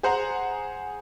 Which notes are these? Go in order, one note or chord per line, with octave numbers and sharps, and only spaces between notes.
G#4 C5 F#5 G#5 A#5